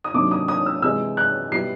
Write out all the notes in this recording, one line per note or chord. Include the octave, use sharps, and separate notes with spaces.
D#6
C3 D#3 F#3 A#3 D4 D6
D#6
D#6
E6
C3 E3 G#3 E6
F#6
B2 G3 B3 E4 C7